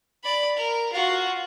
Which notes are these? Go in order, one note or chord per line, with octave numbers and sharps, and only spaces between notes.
D5 B5
A#4
F4 F#4